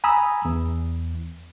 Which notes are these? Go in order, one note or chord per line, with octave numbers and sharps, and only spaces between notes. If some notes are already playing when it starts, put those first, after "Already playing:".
G#5 A#5 B5 D#6 E6
E2